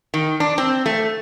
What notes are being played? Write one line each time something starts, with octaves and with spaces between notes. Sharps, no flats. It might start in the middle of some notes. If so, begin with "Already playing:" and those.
D#3
D4
C4
A3